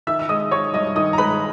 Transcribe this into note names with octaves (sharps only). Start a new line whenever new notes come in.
D#3 E5 E6
E6
G#3 D#5 D#6
D#4 C#5 C#6
G2 D#5 D#6
D#3 D#5 D#6
A#5
G#3 B4 B5